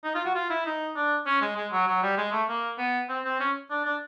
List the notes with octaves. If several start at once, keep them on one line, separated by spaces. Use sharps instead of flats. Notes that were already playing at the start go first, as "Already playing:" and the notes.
D#4
F4
F#4
F4
E4
D#4
D4
C#4
G#3
G#3
F#3
F#3
G3
G#3
A3
A#3
B3
C4
C4
C#4
D4
D4